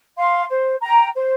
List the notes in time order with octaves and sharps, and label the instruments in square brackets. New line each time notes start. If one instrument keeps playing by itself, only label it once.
[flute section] F5 C6
C5
G5 A#5
C5